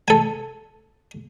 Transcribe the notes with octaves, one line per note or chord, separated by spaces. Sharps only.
A4 G#5